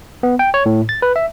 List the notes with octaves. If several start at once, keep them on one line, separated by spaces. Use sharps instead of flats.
B3
G5
C#5
A2
A6
B4
E5